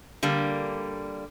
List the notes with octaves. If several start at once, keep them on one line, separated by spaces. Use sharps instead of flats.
D3 G3 A#3